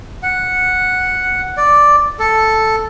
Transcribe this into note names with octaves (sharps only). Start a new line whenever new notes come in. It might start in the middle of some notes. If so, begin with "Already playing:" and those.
F#5
D5
A4